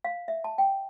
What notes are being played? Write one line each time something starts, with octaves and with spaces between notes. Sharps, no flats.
F5
E5
A5
G5